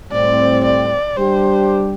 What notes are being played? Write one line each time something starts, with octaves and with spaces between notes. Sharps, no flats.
A2 G3 C4 D5
D5
G3 D4 G4 C5